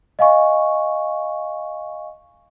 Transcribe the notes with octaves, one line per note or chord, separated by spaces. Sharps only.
D#5 F5 G#5 C#6